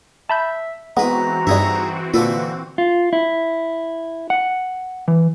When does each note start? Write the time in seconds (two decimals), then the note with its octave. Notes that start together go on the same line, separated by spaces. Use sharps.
0.30 E5 A5 B5 G6
0.97 E3 G#3 B3 C4 F#4 B4 A#5
1.47 G2 G3 D#4 G#4 E5
2.14 A#2 D3 A#3 A4 B4
2.78 F4
3.13 E4
4.30 F#5
5.08 E3